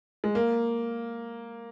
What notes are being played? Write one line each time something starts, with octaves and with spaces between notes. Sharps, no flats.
G#3
A#3